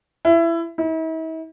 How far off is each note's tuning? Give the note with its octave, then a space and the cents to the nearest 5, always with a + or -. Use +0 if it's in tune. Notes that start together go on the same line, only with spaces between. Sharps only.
E4 +20
E4 -45